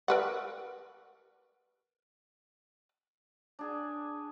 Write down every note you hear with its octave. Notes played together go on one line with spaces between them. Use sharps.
A#4 B4 F#5
D4 G#4 G#5